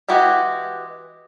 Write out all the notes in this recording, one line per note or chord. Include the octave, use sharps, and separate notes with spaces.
E3 G#3 F#4 G4